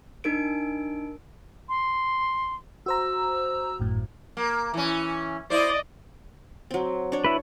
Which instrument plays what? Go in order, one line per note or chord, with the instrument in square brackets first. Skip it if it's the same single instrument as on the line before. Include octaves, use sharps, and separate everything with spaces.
[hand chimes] D4 D#4 A#4 D7
[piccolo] C6
[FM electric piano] F#4 C5 A#5 [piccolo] E6
[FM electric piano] G#1 F#2 A2
[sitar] A#3
E3 C#4
[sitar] E4 C5 [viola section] D5 D#5
[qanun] F#3 C4
D4 C#5
[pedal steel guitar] E4 B4